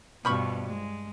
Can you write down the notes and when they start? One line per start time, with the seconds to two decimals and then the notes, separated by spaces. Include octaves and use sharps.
0.25 G2 B2 F3 B5 C#6
0.67 G#3